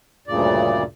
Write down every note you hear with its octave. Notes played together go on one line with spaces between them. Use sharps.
D2 G2 A#2 C#3 D5